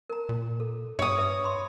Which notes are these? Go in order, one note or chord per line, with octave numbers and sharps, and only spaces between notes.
A#4 A#5
A#2
A4
G2 C#5 D#6
B4 E5
B5 C6